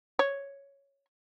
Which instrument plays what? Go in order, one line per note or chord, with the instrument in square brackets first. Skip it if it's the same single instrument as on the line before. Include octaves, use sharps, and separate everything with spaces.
[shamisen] C#5